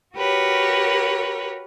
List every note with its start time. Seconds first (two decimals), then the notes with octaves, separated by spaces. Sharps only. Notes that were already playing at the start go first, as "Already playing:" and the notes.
0.15 F#4 G4 A#4 B4 C#5